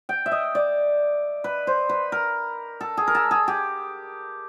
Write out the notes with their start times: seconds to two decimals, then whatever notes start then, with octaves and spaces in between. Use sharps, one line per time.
0.09 G5
0.26 E5
0.31 D#5
0.55 D5
1.44 B4
1.67 C5
1.89 B4
2.12 A#4
2.81 A4
2.97 G#4
3.07 A#4
3.15 A4
3.31 G#4
3.48 G4